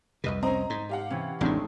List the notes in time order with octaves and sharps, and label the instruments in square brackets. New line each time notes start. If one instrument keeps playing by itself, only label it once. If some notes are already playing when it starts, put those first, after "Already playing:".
[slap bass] C2 F2 C3 [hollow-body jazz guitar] B4 D#5
[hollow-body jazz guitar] C4 C#4 [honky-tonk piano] D#5 A#5
[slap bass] G#2 [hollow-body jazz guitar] C5
[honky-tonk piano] G4 F5 F#5
[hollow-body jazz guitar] C3 [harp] E3 C#4
[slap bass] A1 D#2 C3 [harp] A2 C4 D#4 [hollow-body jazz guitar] G#3 D4